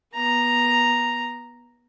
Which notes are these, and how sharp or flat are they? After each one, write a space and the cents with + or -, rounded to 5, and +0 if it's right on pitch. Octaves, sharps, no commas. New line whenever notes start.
B3 -25 A#5 +0